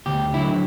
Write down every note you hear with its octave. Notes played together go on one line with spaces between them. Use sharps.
D2 G4
D3 F#3 E4